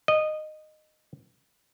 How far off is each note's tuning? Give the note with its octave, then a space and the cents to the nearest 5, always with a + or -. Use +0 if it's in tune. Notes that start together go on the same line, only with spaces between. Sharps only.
D#5 -15